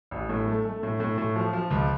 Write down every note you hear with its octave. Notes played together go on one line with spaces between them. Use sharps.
A1
A2
A3
A3
A2
A2
A2
F3
F3
C#2